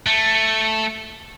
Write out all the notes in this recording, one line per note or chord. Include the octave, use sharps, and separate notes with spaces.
A3